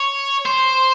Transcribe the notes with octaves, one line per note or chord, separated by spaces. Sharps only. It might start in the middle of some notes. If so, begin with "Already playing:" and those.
Already playing: C#5
C5